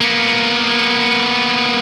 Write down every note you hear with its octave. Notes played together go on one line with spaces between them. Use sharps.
A#3 B3